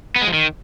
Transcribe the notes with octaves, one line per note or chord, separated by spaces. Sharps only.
B3
G#3
F3
D#3